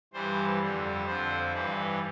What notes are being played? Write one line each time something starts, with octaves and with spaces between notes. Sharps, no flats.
G2 E3 G3 C5
F2 D3 G3
F2 D3 F3 C5
G2 E3 G3 B4